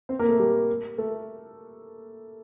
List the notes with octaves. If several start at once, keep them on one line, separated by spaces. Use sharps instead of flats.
C4 C5
A#3 A#4
A3 A4
G3 G4
A3 A4